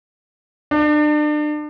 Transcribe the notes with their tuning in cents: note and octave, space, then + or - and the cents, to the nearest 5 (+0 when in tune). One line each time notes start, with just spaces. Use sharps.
D4 +35